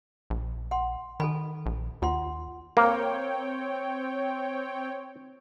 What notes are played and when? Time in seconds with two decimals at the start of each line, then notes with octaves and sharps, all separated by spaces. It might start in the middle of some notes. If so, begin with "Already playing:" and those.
0.30 A#1
0.71 F#5 C6
1.20 D#3 A4 G#5 B5
1.66 A#1
2.02 D#2 F4 F#5 C6
2.77 A#3 C4 C#5 G5